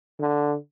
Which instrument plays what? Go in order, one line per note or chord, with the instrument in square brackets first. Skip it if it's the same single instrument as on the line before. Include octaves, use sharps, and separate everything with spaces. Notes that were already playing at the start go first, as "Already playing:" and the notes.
[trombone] D3